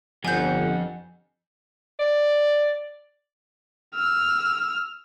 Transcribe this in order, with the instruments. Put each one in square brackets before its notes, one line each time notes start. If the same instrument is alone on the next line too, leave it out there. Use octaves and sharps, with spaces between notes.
[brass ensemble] G1 [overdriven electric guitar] F2 [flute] F#5 [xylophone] G#5 G6
[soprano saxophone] D5
[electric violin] E6 F6